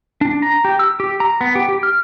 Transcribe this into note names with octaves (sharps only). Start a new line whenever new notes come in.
D4
A#5
G4
E6
G4
A#5
B3
G4
G4
F6